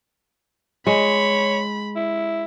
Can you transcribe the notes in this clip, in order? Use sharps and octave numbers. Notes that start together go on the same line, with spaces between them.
G#3 C#5 B5
E4